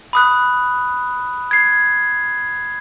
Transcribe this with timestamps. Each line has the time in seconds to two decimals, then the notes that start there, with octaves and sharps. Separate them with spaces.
0.13 B5 D#6 F#6
1.51 G#6 C7